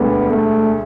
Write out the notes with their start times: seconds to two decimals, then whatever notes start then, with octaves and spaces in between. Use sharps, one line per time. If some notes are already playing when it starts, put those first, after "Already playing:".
Already playing: E1 D2 D3 G3 B3
0.29 A3